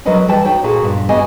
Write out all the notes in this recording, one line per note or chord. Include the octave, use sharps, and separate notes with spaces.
F#3 F#4 A#4 B4 D#5 F#5
E3 G3 B4 G5 A5
D#4 F#4 C#5 G5
A#2 A#3 F#4 G#4 A4
G2 A#2
C#3 B3 F#4 G4 D#5 G#5